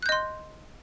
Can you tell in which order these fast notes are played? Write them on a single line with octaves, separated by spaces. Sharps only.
F#6 G6 D#5 C6